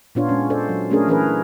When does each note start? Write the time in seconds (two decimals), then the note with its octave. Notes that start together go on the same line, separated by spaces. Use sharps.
0.15 A#2 B3 D4 F4 C#5
0.29 G#3 C#4
0.50 A4 C5 D5
0.69 F#3
0.91 A3 C#4 D4 G#4 A#4
1.08 E3 C#4 G#4 A#4 B4